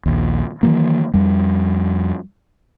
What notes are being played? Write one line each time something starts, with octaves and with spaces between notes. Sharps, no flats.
A#1 D#2
D#3 E3 F#3 A#3
F2 G3